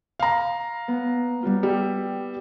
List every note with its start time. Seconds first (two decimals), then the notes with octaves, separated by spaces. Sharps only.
0.20 F5 A#5
0.88 B3
1.43 G3 B3 F4
1.63 G3 E4